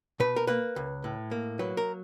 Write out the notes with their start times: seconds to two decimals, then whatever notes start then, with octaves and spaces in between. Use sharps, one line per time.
0.20 B2 B4
0.36 A#4
0.47 A#3 B4
0.76 C#2
1.04 A2
1.31 A#3
1.59 F#3 B4
1.77 A#4